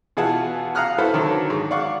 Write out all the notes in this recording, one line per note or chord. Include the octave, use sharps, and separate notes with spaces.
B2 E3 F4 G#4 F#5 A5
F5 F#5 A#5 D#6 F6 F#6
E4 F#4 A4 B4 C5
D3 D#3 F#3 A4
G#2
D5 F5 F#5 C#6 D6